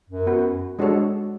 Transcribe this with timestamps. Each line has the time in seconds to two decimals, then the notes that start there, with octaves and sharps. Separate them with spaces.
0.10 F#2
0.26 B3 F#4 B4
0.79 G#3 D4 F#4 A4 C#5